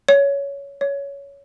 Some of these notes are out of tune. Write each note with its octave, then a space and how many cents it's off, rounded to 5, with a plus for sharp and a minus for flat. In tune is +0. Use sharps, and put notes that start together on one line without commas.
C#5 +15
C#5 +15